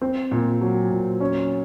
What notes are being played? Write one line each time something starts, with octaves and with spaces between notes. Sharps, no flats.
C4
A#2
F#3
A#2
C#4